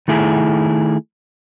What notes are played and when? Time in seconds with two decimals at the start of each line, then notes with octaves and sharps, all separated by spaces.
0.08 D#3 A3 E4 G#4